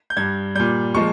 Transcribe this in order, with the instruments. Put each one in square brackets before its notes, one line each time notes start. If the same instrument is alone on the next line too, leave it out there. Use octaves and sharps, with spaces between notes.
[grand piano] G6
G2 G3 G#6
A#2 G3 G6
A#2 F3 G#3 C#6